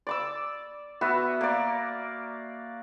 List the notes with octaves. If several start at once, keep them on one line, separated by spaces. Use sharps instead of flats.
D5 D6 E6
B3 F#4 E5
A#3 D5